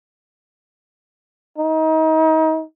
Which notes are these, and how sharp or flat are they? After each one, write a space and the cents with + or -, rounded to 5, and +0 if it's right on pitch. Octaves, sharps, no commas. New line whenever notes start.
D#4 +30